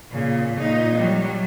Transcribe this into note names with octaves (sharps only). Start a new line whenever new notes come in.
A#2 C#3
A#2 D#4
F#3 G3